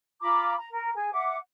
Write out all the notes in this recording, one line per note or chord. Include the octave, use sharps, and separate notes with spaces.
F4 A#5 B5 D6
A#5
A#4
G#4 G#5
E5 F#5 D6